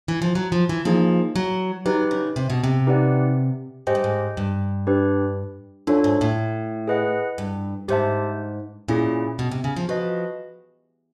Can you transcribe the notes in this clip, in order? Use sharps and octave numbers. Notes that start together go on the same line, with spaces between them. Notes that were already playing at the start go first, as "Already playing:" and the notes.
E3
F3
F#3
F3
E3
F3 A#3 D#4 G#4
F#3
F#3 D#4 G4 B4
C#3
C3
B2
C3
D#4 G4 B4 D5 F#5
G#2 G4 C5 D#5 G5
G2
G#2
G2
D4 G4 B4
F#2 D4 F4 A4 C#5
G#2
A2
G#4 B4 D#5 F#5
G2
G#2 G4 C5 E5 A5
A#2 C#4 E4 G#4
B2
C3
C#3
F3
F3 F#4 B4 D#5